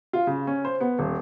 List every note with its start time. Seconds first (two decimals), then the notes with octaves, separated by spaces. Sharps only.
0.13 F4
0.27 C#3
0.47 C#4
0.65 C5
0.81 B3
0.99 D#1